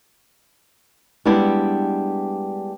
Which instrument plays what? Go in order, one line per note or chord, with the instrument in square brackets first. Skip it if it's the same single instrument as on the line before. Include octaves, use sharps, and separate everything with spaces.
[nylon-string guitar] G3 G#3 B3 D4 E4 G4